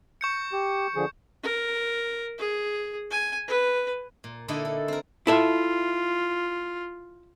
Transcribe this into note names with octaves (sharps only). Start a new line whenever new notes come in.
C#6 G6 C#7
G4
D3 F3 G#4
A#4
G#4
G#5
B4
A#2
A#2 D3 D#4 E4 A4 D#5
A4
C4 A#4
E4 F4 A4 E5